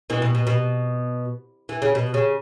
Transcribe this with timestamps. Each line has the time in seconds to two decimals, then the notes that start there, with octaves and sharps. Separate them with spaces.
0.10 B2 E3
0.22 B2
0.35 B2
0.47 B2
1.69 E3
1.82 C#3
1.95 B2
2.14 C#3